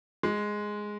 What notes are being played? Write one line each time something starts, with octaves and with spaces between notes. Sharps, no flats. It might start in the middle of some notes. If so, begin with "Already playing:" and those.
G#3